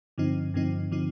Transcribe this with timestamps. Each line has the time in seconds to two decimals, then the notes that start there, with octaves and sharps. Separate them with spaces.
0.18 G2 D3 F3 C4 D#4
0.54 G2 D3 F3 C4 D#4
0.92 D3 F3 C4 D#4